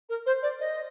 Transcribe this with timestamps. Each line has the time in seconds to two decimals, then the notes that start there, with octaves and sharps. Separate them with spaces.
0.09 A#4
0.26 C5
0.42 D5
0.59 D#5